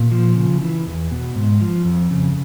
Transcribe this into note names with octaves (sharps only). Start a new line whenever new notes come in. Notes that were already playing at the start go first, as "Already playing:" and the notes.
Already playing: A#2
F3
C#3
E3
E2
B2
G#2
F3
F2
C#3